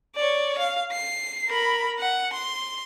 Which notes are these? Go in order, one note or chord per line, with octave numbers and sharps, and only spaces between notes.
C#5 D5
F5
C7
A#4 B5
F#5
C6